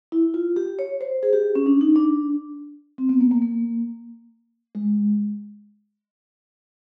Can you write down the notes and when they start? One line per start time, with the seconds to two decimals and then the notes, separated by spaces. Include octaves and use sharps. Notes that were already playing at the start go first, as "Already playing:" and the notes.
0.12 E4
0.34 F4
0.56 G4
0.79 C#5
1.01 C5
1.23 G#4
1.33 G4
1.55 C#4
1.66 D4
1.81 D#4
1.96 D4
2.98 C4
3.09 B3
3.21 A#3
3.31 A#3
3.42 A#3
4.75 G#3